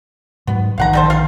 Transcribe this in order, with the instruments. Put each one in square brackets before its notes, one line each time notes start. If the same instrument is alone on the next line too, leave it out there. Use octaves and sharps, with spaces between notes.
[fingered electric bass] G#2 F#3 [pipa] B3
[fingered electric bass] A#1 D3 D#3 [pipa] F5 F#5 A#5
[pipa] G3 A4 C5
F4 F5